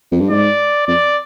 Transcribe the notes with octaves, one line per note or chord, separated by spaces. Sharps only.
F2
G2
G#2 D5
F2 D5